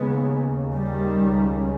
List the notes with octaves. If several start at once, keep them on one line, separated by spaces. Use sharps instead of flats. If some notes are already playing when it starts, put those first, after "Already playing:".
Already playing: D#2 C#3 G#3 B3
D#3 G3
C#2 C#3